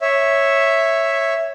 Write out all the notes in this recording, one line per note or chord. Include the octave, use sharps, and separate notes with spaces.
C#5 E5